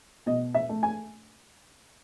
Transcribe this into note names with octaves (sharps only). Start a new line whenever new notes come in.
B2 D#5
E5
A3
G#5